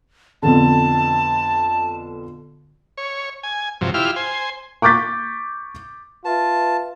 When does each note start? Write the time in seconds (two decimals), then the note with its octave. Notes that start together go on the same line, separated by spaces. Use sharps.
0.43 F2 B2 D3 A5
2.97 C#5
3.43 G#5
3.81 G2 C3 F3 F#3
3.94 E4 F4 G4 F6
4.16 C5 G#5
4.82 C#6 D6 G6 A6 B6
6.25 F4 B4 E5 A5